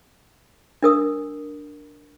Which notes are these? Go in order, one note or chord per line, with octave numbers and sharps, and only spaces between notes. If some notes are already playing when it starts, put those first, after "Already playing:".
D4 A#4 D#6